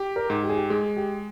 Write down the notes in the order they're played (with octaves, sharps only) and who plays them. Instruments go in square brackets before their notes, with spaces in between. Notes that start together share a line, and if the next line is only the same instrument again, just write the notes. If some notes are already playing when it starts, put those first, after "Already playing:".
Already playing: [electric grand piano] G4
[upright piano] A#4
[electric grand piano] G#2
[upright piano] G4
G#4
G4
[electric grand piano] G#3 [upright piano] G#4
[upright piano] G4